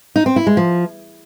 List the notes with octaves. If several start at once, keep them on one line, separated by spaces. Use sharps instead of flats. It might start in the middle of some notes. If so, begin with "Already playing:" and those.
D#4
C4
E4
G#3
F3